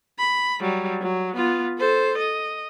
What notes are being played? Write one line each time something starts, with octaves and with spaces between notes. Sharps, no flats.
B5
F#3 G3
F#3
B3 F4
A4 C5
D#5